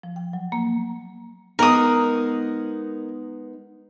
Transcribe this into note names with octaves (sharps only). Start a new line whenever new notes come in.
F3
G5
F#3
A#3
G#3 B3 D#4 A#4 D#6